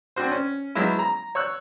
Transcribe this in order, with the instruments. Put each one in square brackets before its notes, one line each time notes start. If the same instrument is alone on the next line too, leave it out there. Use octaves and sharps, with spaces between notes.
[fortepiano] C4 D4 F#4 C5
C#4
F3 F#3 G#3 B3 E4
A#5
C#5 C#6 E6 F#6